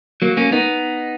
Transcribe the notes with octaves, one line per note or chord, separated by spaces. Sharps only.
F#3 A#3
A#3 C#4
B3 D#4